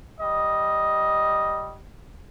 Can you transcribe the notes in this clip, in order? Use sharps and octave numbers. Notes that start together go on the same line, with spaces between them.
G3 D#5